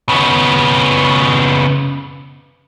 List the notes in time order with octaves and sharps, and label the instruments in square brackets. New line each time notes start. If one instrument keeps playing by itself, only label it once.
[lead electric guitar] C#3 B3